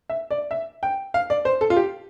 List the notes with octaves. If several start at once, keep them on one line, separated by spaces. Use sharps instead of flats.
E5
D5
E5
G5
F5
D5
C5
A4
F4
G4